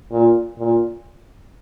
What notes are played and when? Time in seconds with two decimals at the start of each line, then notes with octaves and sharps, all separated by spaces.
0.12 A#2
0.59 A#2